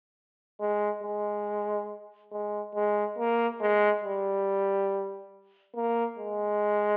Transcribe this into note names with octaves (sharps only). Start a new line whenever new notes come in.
G#3
G#3
G#3
G#3
A#3
G#3
G3
A#3
G#3